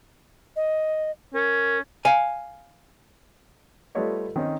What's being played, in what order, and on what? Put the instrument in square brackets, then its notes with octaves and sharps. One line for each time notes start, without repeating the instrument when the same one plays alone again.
[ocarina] D#5
[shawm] C#4 [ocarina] A#4
[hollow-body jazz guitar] F5 G#5
[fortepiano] G3 A3 F4 B4 C#5 D#5
D#3 C4 C#4 D#4